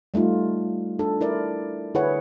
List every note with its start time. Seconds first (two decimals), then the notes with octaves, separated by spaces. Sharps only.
0.14 G3 A3 D#4 F4
0.99 D4 A4
1.21 E4 A#4 D5
1.94 D3 E4 G#4 B4 C#5 F#5